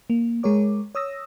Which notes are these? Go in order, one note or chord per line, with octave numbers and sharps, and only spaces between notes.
A#3
G#3 G#4 A#4 C#5 D6
C#5 D#6 E6 A#6